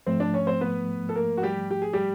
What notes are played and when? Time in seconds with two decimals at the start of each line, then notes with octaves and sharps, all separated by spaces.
0.06 G#2 F3 A3 C4 C5
0.20 D4 D5
0.34 C#4 C#5
0.47 C4 C5
0.61 B3 B4
1.09 A4
1.16 A#3 A#4
1.37 F#4
1.43 G3 G4
1.71 G4
1.82 G#4
1.93 G3 G4